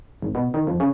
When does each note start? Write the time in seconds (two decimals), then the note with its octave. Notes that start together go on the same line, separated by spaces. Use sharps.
0.22 G#1
0.35 B2
0.54 D#3
0.67 F2
0.80 C#3